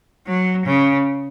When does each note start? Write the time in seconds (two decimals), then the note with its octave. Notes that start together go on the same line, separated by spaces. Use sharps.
0.27 F#3
0.67 C#3